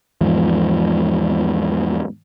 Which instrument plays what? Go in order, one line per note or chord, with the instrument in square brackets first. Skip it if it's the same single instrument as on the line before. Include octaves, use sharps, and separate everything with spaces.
[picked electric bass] E2 G#2 F3